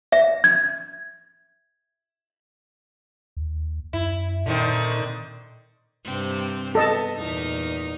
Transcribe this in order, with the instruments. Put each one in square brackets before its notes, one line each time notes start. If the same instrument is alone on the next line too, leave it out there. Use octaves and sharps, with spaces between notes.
[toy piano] E5
[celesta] G#6
[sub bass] D#2
[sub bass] F#2 [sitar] E4
[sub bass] A#2 [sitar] D3 D#3 C4
[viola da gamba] G2 C3 C4
[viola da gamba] B3 [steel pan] A4 D#5 A5
[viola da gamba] E2 A#2 D#4